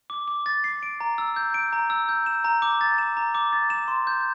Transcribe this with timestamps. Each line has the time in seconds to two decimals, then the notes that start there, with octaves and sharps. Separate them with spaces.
0.10 D6
0.28 D6
0.46 A6
0.64 C7
0.83 D7
1.01 A#5
1.18 E6
1.36 G6
1.54 D7
1.73 A#5
1.90 E6
2.09 G6
2.26 E7
2.44 A#5
2.62 D6
2.81 A6
2.98 E7
3.17 A#5
3.35 D6
3.53 A6
3.70 E7
3.88 C6
4.07 G6